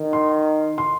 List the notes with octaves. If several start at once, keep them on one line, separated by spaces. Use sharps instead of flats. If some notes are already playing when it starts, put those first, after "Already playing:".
Already playing: D#3
C6
C6